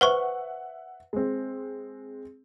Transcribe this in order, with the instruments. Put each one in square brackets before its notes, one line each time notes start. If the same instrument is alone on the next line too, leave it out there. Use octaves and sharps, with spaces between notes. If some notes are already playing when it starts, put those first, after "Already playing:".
[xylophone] B4 C5 C#6 [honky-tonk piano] E5 F#5
[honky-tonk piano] G#3 C4